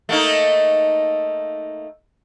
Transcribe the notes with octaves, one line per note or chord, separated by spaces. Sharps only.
A3 A#3 D#4